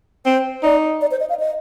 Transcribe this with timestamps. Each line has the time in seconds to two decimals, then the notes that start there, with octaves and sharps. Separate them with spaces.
0.26 C4 C5
0.63 D#4 D5
1.01 D5
1.11 C5
1.20 D#5
1.30 F5
1.40 D#5